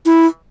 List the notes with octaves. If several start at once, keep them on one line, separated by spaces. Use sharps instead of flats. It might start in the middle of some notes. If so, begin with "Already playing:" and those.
E4